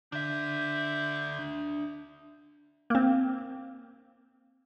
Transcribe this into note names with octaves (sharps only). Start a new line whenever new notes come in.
D3 D4 E5 G6
A#3 C4